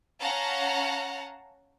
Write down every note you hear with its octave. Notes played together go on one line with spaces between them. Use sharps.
C#4 F5 F#5 A5 A#5